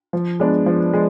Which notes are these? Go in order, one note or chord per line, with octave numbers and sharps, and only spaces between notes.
F3
G#3 B3 D4
F3
G#3